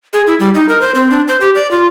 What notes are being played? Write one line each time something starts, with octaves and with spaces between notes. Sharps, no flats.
G#4
E4
G3
D#4
A#4
C5
C4
D4
C5
G4
D5
F4